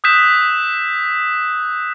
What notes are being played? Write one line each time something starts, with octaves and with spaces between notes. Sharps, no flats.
D#6 E6 F#6 G6 B6 E7